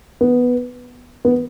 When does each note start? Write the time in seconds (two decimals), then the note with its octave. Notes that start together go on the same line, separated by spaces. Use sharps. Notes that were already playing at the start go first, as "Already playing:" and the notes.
0.21 B3
1.25 B3